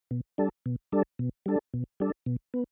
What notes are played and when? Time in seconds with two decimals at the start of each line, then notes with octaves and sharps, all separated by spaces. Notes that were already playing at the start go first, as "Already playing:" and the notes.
0.11 B2
0.38 G3 D4 A4
0.66 B2
0.92 G3 D4 A4
1.19 B2
1.46 G3 D4 A4
1.74 B2
2.00 G3 D4 A4
2.26 B2
2.54 B3